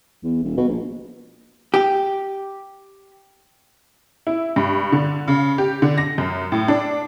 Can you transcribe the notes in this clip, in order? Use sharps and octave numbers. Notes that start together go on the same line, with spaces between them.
E2
D#1
B2
A#1
G4
E4
G2
D3
C#3
G4
D3
A#6
F#2
A2
D4